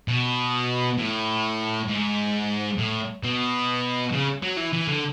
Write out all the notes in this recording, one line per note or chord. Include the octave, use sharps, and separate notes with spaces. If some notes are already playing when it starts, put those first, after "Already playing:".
B2
A2
G#2
A2
B2
C#3
F#3
E3
E3
D3